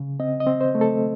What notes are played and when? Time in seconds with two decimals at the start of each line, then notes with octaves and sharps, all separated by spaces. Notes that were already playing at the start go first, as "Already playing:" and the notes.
Already playing: C#3
0.20 C4 D#5
0.40 D#5
0.47 C4
0.61 C5
0.75 A3
0.81 A4